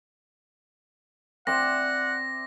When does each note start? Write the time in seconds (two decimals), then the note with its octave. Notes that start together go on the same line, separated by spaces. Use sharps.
1.47 C4 D5 E5 F#5 A#6